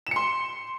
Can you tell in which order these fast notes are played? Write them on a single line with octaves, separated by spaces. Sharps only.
E7 C#7 C6